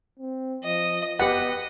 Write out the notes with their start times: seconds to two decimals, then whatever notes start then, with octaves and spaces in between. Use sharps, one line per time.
0.19 C4
0.64 F3 D#5
1.20 B3 G4 B4 D#5 F#5